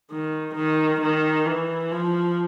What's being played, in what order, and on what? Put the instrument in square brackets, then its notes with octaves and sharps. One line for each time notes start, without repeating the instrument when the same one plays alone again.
[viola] D#3
D#3
D#3
E3
F3